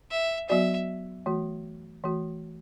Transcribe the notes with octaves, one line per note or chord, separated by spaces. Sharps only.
E5
F#3 B3 F#4 D5 E5
E3 A3 F#4
E3 A3 F#4